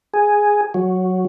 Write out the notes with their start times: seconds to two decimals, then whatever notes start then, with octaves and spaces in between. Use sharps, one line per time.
0.14 G#4
0.74 F#3